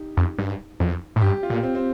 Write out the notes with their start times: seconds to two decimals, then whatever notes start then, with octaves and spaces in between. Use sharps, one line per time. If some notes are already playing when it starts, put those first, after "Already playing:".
Already playing: D#4 G4
0.17 F2
0.38 G2
0.80 F2
1.16 A2
1.22 G2 G4
1.43 F4
1.50 A#2
1.63 C4
1.75 C4